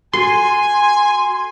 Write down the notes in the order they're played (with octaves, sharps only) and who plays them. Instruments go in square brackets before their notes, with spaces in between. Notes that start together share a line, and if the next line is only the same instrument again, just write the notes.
[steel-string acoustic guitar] F#4 A4 [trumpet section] G#5 [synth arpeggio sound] C6